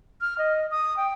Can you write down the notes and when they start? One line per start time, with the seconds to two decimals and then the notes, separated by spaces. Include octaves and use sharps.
0.21 F6
0.38 D#5
0.71 D#6
0.96 G5